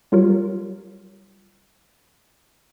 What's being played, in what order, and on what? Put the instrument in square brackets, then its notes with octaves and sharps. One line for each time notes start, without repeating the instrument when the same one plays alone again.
[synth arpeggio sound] F#3 G3 F4 G4 A#4 C#5